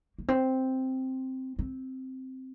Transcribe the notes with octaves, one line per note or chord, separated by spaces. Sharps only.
A#3
C4
C4